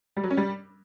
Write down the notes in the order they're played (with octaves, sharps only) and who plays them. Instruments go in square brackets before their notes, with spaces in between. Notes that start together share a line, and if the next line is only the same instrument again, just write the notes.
[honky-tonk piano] G3
F#3
C#4
G3